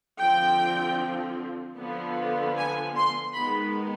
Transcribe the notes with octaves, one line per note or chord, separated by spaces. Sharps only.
D3 F3 C4 G5
D3 F3 B3
G#5
C6
D#3 G#3 B3 D#4 B5